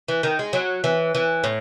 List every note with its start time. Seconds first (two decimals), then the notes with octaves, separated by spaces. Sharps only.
0.08 E3
0.23 D#3
0.39 G#3
0.53 F#3
0.84 E3
1.15 E3
1.44 A2